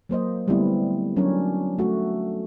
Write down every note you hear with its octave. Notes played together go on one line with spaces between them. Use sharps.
F#3 A#3 C5 D#5
D3 G3 A3 B3 C4 E4
F#3 C#4 D4 A#4 C#5
A3 F#4